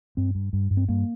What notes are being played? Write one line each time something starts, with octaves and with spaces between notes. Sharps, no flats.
G2 C4
G2
G2
G2
C4
G2 A#3